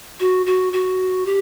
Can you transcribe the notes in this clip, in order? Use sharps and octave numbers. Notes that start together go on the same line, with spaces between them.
F#4
F#4
F#4
G4